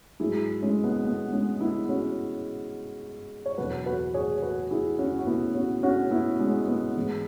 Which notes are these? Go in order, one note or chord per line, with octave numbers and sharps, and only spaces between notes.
G#2 F#3 E4 G#4
G#3 C#4
B3
B3
G#3 C#4
B3 E4
C#4 F#4
C#5
E2 B2 F#3 F#4 B4
F#4 B4
G#4 C#5
F#4 B4
E4 G#4
C#4 F#4
F#4
B3 E4
C#4 F#4
C#4 F#4
B3 E4
G#3 C#4
B3
G#2 E3 G#3